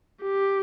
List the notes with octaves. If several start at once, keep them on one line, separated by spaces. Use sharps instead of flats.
G4